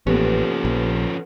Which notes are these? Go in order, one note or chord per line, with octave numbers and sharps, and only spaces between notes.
A1 F3 A#3 B3 C#4 G4 A4 B4
A#1